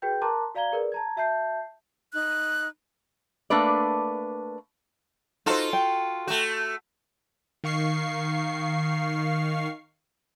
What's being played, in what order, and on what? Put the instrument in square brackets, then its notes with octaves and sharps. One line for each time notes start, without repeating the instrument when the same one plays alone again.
[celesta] F#4 G#4 B4 G5 G6
A#4 A5 A#5 C6 D6 F#6
F#4 D5 F5 A#5 G#6 G7
G#4 A#4 B4 D5
A5 A#5 G#6
F#4 E5 A5 G6 C7
[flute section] D#4 F#6
[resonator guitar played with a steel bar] A3 A#3 D4 B4 D5
[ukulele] D#4 C5 [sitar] F4 F#4 A4
[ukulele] G5
[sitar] A3 F#4
[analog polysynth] D#3 F5 C#6 C7